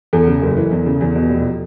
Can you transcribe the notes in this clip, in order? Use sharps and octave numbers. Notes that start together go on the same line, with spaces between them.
E2 A4
C#3
F#1
E3
E2
C#3
E2
B2
F1